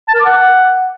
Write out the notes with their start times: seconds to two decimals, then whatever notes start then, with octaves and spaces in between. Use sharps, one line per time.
0.08 A5
0.14 A#4
0.20 D6
0.25 F#5